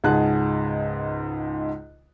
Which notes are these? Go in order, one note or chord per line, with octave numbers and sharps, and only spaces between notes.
C#2 G#2 G#4 F#5 A5 F#6